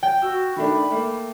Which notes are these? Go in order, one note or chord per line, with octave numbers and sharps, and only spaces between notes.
G5
F#4 E6
D#3 A3 D4 B5
A3 A#3